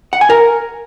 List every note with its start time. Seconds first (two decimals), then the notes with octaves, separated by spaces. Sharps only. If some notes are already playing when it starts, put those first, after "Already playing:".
0.13 F#5
0.21 G#5
0.30 A#4